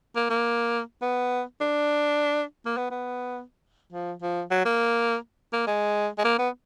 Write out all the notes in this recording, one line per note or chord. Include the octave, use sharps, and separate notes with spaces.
A#3
A#3
B3
D4
A#3
B3
B3
F3
F3
F#3
A#3
A#3
G#3
G#3
A#3
B3